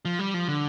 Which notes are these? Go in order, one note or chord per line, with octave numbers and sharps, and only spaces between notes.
F3
G3
F3
D3